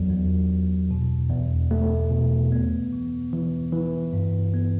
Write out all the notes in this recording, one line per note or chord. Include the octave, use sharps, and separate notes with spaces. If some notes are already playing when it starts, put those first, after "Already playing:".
Already playing: E2 F#3
E2
E2
B2
E2
A3
B2
B3
E3
E3
E3
G2
B3